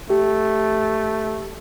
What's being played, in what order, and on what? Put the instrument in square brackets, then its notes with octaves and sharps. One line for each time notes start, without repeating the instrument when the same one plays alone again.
[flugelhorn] A3 [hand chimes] G4